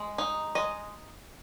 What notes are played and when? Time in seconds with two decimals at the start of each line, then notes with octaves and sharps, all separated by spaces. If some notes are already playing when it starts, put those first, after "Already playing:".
Already playing: G#3
0.18 D#4
0.55 G#3 D#5